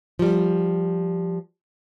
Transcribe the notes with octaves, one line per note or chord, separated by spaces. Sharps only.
F3 G3